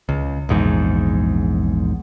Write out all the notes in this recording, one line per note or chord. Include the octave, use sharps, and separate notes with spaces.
C#2
A#1 E2 G#2